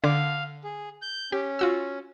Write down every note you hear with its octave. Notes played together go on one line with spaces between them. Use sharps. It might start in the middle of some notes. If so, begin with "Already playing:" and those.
D3 F5 D6
G#4
G6
C#4 G4
F4 F#4 E6